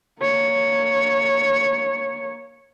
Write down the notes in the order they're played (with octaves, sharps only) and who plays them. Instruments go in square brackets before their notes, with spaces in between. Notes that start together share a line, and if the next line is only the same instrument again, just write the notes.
[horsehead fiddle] A#3 C#5